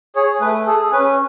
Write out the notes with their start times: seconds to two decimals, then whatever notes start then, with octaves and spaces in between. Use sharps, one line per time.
0.16 G#4 C#5
0.41 A3 B4
0.67 G#4 A4
0.92 C#4 B4